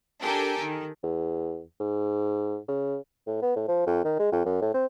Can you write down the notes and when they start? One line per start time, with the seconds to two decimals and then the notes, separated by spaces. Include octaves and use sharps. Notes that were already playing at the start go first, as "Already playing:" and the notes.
0.21 D4 G4 A4 A#4 G5 G#5
0.60 D#3
1.03 E2
1.80 G#2
2.68 C#3
3.27 A2
3.42 B3
3.56 A2
3.68 F3
3.86 F2
4.04 D#3
4.19 G#3
4.32 F2
4.45 F#2
4.61 A2
4.74 C4